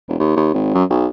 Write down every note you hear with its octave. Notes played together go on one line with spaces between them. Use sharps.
E1
D#2
D#2
G#1
F#2
B1